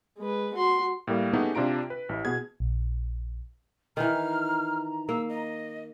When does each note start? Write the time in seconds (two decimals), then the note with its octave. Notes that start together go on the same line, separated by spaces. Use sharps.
0.18 G#3 B4
0.54 F#4 C6
1.07 A2 G3 A#3 A#4 F5
1.33 A3 B3 C#4 D#4 G4 G#4
1.55 C3 D4 F4 A#5 D7
1.90 B4
2.09 A1 E4
2.25 B2 B3 G#4 G#6
2.60 A#1
3.97 D#3 E3 A#5 F6
5.09 A#3 E6
5.29 D#5